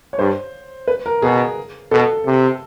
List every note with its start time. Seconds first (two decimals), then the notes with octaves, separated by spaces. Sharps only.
0.13 C#5
0.19 G2 C5
0.88 B4
1.06 A#4
1.22 B2 G#4
1.91 B2 A4
2.26 C3